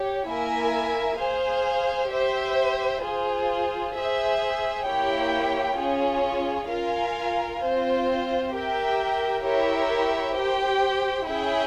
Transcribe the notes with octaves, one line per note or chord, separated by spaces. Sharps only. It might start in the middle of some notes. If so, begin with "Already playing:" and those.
Already playing: G4 C#5
A#3 E4 A#4 E5 G#5
G#4 C5 F5
G4 C5 E5
F4 G#4 C5
G#4 C5 E5
A#3 E4 G4 C#5 G5
C#4 F4 G#4 C#5
F4 A#4 F5 G#5
C4 F4 C5
G4 A#4 E5 G5
E4 G4 A#4 C#5 E5
G4 C5 G5
C#4 E4 G#4 E5 G5